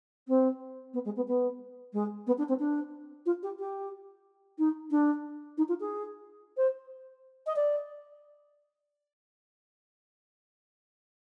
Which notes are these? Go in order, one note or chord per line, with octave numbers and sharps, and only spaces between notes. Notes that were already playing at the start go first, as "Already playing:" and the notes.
C4
B3
G#3
B3
B3
G#3
B3
D4
C4
D4
F4
G4
G4
D#4
D4
D#4
F4
G#4
C5
D#5
D5